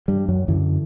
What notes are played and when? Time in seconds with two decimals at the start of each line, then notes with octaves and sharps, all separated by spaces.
0.08 G2 G3
0.28 F#2 F#3
0.48 F#2 D3 E3